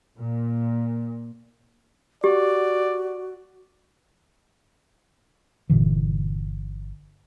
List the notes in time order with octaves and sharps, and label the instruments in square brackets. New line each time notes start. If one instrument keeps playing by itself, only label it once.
[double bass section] A#2
[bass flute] F#4 [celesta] G4 [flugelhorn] D5
[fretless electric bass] G1 A#2 D3 E3